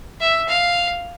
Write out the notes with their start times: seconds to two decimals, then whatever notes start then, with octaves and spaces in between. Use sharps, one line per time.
0.21 E5
0.48 F5